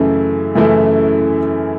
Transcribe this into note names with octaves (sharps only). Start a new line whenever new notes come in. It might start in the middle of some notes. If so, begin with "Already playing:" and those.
Already playing: F#2 C#3 E3 A3 E4
F#2 C#3 E3 A3 E4